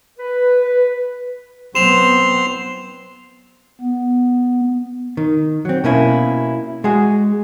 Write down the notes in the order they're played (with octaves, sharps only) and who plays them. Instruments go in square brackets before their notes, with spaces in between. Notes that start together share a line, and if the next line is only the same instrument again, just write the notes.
[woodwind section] B4
[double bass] F#3 B3 [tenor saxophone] C4 [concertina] C6 [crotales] E7 F7
[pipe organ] B3
[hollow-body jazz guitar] D#3
F#3 C4
B2 A#3 C#4 E4
G#3 F#4 G#4